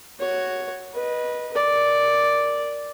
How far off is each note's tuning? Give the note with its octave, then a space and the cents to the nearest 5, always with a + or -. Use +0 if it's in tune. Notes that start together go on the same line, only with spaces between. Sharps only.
F#4 +0 C#5 +0
B4 -20 D#5 +0
A#4 +0 D5 +0